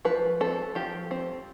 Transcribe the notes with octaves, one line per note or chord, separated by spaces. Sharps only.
F3 B4
C4 A4
F3 G4
C4